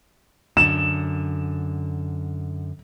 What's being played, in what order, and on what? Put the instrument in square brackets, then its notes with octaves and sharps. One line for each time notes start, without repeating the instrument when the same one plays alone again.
[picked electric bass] F#2 D3 [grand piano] E7